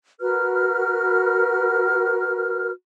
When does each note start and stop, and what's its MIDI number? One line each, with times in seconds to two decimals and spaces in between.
0.20 2.71 66
0.20 2.71 70
0.20 2.71 71
0.20 2.71 89